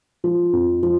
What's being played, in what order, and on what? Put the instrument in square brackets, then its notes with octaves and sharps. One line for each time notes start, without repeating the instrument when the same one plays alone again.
[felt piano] F3
F2
F3